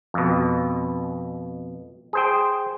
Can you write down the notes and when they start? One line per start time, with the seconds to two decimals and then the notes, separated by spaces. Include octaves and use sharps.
0.14 F2 B2
2.13 G#4 C5 G5